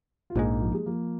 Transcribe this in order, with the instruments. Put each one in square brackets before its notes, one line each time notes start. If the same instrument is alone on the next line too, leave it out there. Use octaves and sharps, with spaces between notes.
[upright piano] F4
[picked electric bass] A#1 G#2 G#3 [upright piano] A#3 D#4
[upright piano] F3
G#3
F3 A#3